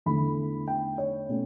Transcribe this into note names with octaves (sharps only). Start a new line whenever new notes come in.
E2 D3 A3 E4 B5
G5
C#5
B2 A3 C#4